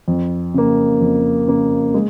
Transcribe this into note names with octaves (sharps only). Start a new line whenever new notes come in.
F2
C#3 A#3
F2
C#3 A#3
G#3